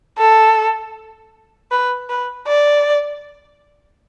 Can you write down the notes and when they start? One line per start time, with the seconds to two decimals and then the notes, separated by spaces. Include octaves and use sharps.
0.18 A4
1.71 B4
2.09 B4
2.47 D5